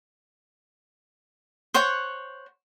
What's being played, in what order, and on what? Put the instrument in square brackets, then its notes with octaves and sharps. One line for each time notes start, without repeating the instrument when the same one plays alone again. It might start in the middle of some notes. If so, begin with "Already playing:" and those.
[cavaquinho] C5 C#5 F#5 C#6